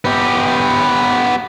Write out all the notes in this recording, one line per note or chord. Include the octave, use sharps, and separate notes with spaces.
B3 G4